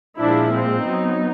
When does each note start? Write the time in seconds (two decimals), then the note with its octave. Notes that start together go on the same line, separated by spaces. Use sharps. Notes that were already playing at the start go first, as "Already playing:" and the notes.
0.19 A#2 F3 G#3 D4 E4
0.50 C4
0.82 F#3 B3 D#4